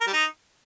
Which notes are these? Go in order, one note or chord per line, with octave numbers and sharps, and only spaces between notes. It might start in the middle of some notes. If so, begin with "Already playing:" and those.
A#4
G3
D#4